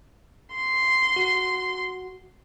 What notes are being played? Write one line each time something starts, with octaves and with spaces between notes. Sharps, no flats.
C6
F#4